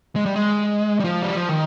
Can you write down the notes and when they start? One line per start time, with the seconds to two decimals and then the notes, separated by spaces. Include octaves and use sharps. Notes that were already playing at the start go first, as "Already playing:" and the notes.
0.16 G#3
0.25 G3
0.36 G#3
1.00 G3
1.04 F3
1.22 G3
1.35 F3
1.49 D#3